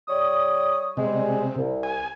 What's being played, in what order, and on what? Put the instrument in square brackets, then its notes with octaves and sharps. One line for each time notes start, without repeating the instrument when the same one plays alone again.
[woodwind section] G3 C#5 D#6
[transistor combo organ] C3 [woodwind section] G3 G#3
[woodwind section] C2
[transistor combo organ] G#5